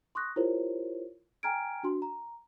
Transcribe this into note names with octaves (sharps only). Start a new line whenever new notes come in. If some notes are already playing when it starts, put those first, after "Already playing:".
C6 C#6 D#6 F#6 A#6
E4 F4 G4 A#4 C5 C#5
G5 G#5 A#5 F6 G#6 D7
D4 F#4 C6
A#5